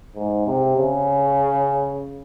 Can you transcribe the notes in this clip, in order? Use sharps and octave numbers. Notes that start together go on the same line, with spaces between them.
G#2
C3
C#3